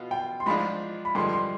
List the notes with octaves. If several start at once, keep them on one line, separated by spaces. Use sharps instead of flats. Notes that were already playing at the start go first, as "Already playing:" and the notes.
Already playing: B2 B3 F4
G5
C6
G#2 F3 G#3 D4 F4 B5
B5
G2 D3 F3 G#3 C6
C6